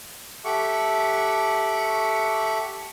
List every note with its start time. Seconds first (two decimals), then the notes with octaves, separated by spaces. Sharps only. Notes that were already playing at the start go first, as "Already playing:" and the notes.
0.45 G4 A4 E5 F#5 C#6 D6